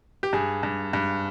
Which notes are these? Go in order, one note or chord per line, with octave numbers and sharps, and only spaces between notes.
G4
G2 G#4
G2
G2